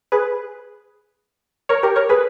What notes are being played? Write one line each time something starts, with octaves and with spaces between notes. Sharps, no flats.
G#4 B4
A#4 C#5
G4 A#4
A#4 C#5
G#4 B4